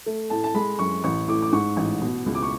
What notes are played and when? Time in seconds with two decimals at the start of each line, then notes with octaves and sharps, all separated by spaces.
0.06 A3
0.30 A2 A5
0.44 A5
0.54 G#3 B5
0.79 F#2 C#6
1.04 A1 C#6
1.28 A2 D6
1.42 D6
1.52 G#2 C#6
1.77 A1
2.01 B2
2.26 C#2
2.35 D6
2.43 C#6